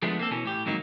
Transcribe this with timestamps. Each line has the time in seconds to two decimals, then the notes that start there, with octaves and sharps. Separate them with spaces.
0.02 F3 G#3 A3 B3 D4
0.19 A#3 C4 A4
0.31 B2 E3 C#4
0.45 A2 G4
0.65 F2 G#2 D#3 F#3 A#3 D#4